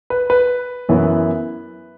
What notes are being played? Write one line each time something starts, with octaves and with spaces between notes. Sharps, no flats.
B4
B4
F#2 E3 B3 E4